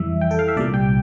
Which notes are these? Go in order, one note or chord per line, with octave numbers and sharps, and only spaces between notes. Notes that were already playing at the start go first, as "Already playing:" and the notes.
Already playing: F2 E3 G3 E5
G5
A4
F5
E5
C2 A#2 G3 D5
G5